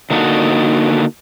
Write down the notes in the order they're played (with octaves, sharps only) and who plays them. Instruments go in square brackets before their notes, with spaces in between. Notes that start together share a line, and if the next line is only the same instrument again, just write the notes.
[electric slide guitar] D3 A#3 D#4 F#4 A4